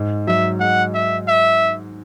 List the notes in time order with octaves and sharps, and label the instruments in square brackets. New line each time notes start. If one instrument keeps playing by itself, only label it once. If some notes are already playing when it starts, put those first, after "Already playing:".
Already playing: [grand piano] G#2
[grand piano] F#3 [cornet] E5
[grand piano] G#3 [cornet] F#5
[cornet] E5
E5